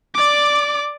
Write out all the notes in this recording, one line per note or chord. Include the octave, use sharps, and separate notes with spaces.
D5 D6